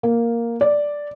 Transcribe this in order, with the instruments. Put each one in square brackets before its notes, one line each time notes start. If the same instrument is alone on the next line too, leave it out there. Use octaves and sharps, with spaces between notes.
[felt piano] A#3
D5